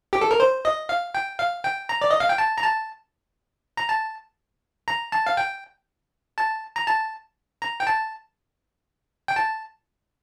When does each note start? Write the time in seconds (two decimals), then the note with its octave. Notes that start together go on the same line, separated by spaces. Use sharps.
0.13 G4
0.21 A4
0.31 A#4
0.40 C5
0.65 D#5
0.89 F5
1.15 G5
1.39 F5
1.64 G5
1.89 A#5
2.01 D5
2.11 D#5
2.20 F5
2.29 G5
2.38 A5
2.58 A#5
2.64 A5
3.77 A#5
3.89 A5
4.88 A#5
5.12 A5
5.27 F5
5.37 G5
6.38 A5
6.76 A#5
6.87 A5
7.62 A#5
7.80 G5
7.87 A5
9.28 G5
9.36 A5